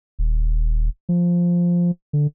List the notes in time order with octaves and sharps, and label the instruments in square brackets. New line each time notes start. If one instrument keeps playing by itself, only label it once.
[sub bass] D#1
F3
D3